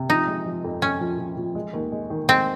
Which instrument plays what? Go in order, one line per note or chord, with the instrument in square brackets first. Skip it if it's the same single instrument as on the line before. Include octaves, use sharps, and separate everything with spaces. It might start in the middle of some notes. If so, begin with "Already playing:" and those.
Already playing: [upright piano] C3
[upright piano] F3 [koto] D#4
[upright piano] G#3
F3
F2
[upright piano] F2 [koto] C#4
[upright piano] F3
F3
F3
G#3
D#2
G#3
D#3
[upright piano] G#3 [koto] C4